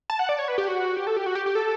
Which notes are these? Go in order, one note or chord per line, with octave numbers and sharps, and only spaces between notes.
A5
F#5
D5
C#5
B4
G4
F#4
G4
A4
G4
F#4
G4
G4
A4